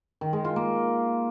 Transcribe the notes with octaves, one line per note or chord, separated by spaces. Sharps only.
D#3
G#3
F4
A#3